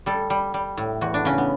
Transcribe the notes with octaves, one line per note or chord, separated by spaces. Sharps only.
G3 A4
G3
G3
A2
E2 F#4
D4
C#3 C#4
B3